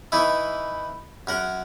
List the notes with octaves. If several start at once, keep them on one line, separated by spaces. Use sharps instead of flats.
E3 D#4 E4
F#2 A#4 F#5